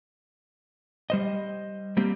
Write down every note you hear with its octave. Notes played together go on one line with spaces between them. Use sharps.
G3 C5 D#5
G3 A#3 C4 G4